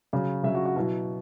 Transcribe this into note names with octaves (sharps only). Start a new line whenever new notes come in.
C#3 F#3
C#3 F#3 E5
F#4
F#4
B2 F#3 E4